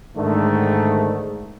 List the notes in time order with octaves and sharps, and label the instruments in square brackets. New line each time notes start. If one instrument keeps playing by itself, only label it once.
[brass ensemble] G#2 D3 D#3 A3